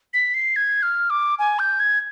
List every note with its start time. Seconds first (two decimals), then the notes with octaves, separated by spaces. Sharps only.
0.14 B6
0.34 C7
0.56 G#6
0.83 F6
1.10 D6
1.39 G#5
1.59 G6
1.80 G#6